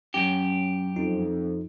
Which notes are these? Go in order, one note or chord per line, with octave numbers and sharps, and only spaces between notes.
F#2 C#4 G4
F2 D#4 F4